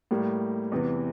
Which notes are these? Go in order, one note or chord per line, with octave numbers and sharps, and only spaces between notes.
A2 G3 A#3
E2 C3 E3